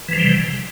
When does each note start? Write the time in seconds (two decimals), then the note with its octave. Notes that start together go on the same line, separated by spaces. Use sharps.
0.09 E3
0.13 F3
0.18 G3
0.22 C3